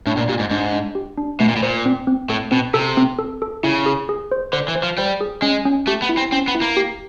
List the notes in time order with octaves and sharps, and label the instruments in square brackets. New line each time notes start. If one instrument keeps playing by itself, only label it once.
[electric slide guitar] A2 [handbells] D4
[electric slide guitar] A#2
[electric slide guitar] A#2 [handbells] G4
[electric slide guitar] G#2
[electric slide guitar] G#2 [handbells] D4
[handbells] D4
G4
D4
[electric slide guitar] B2 [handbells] A3
[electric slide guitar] A#2
A2
[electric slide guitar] A#2 [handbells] C5
[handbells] C4
C4
[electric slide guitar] A2 [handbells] A4
[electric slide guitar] B2 [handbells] C4
[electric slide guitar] C3 [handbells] A4
[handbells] C4
A4
A4
[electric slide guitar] C#3 [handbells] E4
[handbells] G#4
G#4
C5
[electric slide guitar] D3 [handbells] C5
[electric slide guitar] E3
[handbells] C5
[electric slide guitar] F3
[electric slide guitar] G3 [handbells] C5
[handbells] G#4
[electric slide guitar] G#3 [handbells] C#4
[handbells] C#4
[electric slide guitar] A3 [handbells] G4
[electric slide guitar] B3
[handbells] E4
[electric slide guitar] C4
[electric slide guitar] C4 [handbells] C#4
[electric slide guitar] B3
[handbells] E4
[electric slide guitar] A#3
[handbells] G4